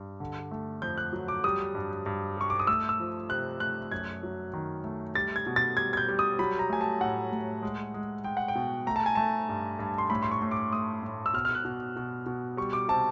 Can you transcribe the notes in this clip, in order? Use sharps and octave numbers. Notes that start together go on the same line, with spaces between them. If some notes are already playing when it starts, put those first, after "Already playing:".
Already playing: G2
D3
A3
F2 G6
F#6
F#3
D6
G3 D#6
G2
G2
G3 C#6
D6
D#6
A3 E6
E6
F3
C3 F#6
A3 F#6
F#2 G#6
F#3
D#3
A3
G3 A6
G#6
B2
A6
G3 G#6
G#6
G6
G3
D#6
F#3 B5
A#5
A3 G#5
A5
A2 F#5
A2
G#3
G#3
G#3 G5
F#5
G5
B2
A3 A#5
A5
G#5
A3 A5
G2
G2
C6
A2 B5
C6
C#6
A2
D6
A3 D#6
A2
E6
B2 F6
F6
F#6
B2
B2
B2
G3 C#6
D6
C3 A5